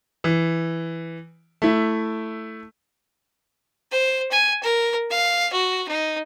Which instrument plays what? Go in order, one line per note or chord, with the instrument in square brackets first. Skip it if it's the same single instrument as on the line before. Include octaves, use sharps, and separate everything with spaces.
[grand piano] E3
A3 E4
[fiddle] C5
G#5
A#4
F5
F#4
D#4